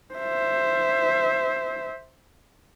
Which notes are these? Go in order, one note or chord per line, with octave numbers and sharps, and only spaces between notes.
C5 E5